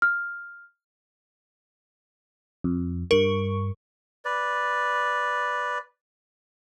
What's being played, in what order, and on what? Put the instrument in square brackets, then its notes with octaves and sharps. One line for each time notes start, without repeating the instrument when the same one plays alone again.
[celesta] F6
[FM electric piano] F2
[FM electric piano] G2 C#6 [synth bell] A#4
[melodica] B4 D5